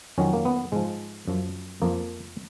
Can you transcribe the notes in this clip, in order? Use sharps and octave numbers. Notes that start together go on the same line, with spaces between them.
F2 D#3 F#3 C#4
A#3
B3
G#2 F3 G#3
F#2 F3
F2 F3 A#3